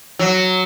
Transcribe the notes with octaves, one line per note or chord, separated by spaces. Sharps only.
F#3